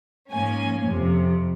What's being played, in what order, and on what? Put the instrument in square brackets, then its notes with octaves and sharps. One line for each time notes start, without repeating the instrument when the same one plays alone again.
[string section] G#2 F3 A#3 C#4 G#5
F2 C3 F3